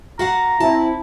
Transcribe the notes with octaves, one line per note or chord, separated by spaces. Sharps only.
F#4 F5 F#5 A#5
C4 E4 A5